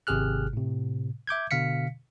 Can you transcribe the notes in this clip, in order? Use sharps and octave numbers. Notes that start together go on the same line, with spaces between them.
G#1 C3 G4 G#4 F6 F#6
A2 C3
E5 D6 G6 G#6
B2 D3 F5 B6 C#7